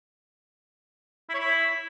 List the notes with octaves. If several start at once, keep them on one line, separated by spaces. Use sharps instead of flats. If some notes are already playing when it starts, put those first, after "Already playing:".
E4
C#5
E4